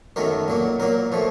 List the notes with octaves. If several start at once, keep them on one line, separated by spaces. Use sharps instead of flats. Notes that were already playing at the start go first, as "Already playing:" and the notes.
F#2 D#3 F#3 A3 A#4
A#2 F#3 A#3
A#2 F#3 A#3 A#4
A#2 F3 A3